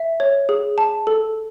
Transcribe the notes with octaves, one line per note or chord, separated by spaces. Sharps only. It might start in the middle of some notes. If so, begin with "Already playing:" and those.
Already playing: E5
C#5
G#4
A5
A4